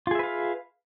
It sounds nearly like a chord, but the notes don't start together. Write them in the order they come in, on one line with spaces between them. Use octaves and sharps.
F4 G#4 E5 B4 F5